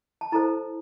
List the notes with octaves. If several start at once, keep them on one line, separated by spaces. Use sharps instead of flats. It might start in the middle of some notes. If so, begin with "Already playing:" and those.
A5
E4 A4 C5 A#5